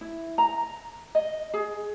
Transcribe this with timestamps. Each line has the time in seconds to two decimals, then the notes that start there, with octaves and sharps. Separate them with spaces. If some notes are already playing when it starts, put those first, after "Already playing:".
0.01 E4
0.38 A#5
1.15 D#5
1.54 G#4